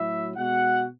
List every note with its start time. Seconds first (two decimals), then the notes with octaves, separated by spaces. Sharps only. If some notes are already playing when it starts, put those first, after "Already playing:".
Already playing: A2 F#3 E4 E5
0.36 B2 G#3 F#4 F#5